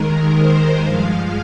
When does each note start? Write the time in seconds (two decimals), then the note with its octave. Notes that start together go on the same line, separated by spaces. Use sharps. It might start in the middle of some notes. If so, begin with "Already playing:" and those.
Already playing: D#2 D#3 G#3 A#4
0.39 C5
0.83 G2 F3 G#3 F5